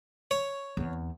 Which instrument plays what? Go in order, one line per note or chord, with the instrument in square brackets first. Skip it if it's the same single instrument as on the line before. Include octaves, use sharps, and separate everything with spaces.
[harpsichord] C#5
[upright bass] E2 C4